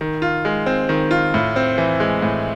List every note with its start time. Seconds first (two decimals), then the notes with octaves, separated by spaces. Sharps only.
0.01 D#3
0.22 F4
0.45 G#3
0.66 C4
0.89 D#3
1.11 F4
1.34 A2
1.56 C4
1.78 E3
2.00 G#3
2.22 A2